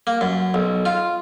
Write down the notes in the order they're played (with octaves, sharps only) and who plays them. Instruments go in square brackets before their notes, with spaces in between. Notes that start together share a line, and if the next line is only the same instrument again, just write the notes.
[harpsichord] A#3
F#2
B1
F4